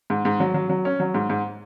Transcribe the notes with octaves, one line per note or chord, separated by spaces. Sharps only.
G#2
G#2
F#3
F#3
F#3
C#4
F#3
G#2
G#2